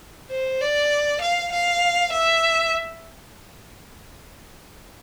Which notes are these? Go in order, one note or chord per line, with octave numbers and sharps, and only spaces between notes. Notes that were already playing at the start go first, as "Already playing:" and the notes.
C5
D5
F5
F5
E5